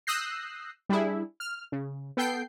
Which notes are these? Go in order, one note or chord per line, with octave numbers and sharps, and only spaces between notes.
D#6 E6 F#6 G6 A#6 C7
G3 D4 E4 G#4
F6
C#3
B3 A4 G5 G6 C7